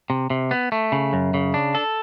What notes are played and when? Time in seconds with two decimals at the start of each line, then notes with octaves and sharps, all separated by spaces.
0.10 C3
0.30 C3
0.51 B3
0.72 A3
0.92 C#3
1.13 F#2
1.34 C#3
1.54 D4
1.75 A4